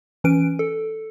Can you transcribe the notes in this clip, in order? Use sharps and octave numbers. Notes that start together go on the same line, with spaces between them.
E3 C#4 B4 D7
A4